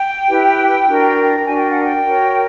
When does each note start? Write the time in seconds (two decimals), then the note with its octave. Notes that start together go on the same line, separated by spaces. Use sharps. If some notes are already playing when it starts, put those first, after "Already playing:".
Already playing: G5
0.29 E4 G4 B4
0.88 D4 F#4 A#4
1.46 D4 F#4 A#4 G#5
1.58 G5
1.70 F#5
1.82 G5
2.04 F#4 A#4 C#5